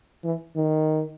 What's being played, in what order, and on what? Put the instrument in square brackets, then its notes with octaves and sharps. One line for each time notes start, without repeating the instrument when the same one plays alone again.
[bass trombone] E3
D#3